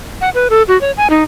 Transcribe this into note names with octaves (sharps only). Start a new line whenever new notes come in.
F#5
B4
A4
F#4
C#5
G#5
D#4